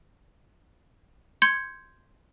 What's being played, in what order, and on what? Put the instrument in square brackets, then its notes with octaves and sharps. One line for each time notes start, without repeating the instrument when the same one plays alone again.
[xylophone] C6 G6 G#6 C#7